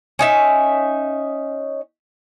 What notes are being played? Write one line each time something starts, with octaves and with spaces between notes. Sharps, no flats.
C#4 D#4 E5